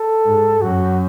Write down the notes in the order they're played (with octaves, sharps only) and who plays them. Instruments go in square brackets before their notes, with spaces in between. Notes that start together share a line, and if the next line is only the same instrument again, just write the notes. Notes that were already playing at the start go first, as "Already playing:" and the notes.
Already playing: [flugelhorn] A4
[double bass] G#2
[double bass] F#2 [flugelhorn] F#4